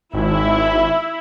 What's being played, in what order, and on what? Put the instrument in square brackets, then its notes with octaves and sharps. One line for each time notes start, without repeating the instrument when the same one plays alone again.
[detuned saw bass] G#1 [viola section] E4